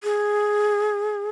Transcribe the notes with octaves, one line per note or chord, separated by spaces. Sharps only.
G#4